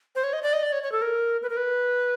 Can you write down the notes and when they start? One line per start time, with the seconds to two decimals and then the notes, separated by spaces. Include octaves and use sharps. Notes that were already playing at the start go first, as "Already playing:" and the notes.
0.15 C5
0.24 C#5
0.33 D#5
0.43 D5
0.53 D#5
0.63 D5
0.73 C#5
0.83 C#5
0.92 A4
1.02 A#4
1.42 B4
1.50 A#4
1.57 B4